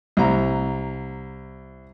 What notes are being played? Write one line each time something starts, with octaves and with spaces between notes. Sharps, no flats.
C2 A#5